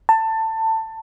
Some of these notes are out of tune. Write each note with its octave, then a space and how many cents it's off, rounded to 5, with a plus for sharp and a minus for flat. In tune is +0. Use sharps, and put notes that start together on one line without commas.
A5 +20